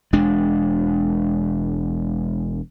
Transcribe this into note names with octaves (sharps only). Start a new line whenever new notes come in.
E1 G#3 D4